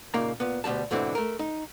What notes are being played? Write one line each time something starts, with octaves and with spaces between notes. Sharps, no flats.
A#2 C#3 A#3 D#4 A#5
A#2 B3
D2 B2 G3 A5
E2 G#2 B2 D3 C4 E4
A3 A#4
D#4